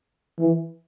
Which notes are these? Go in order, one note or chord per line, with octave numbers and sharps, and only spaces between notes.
E3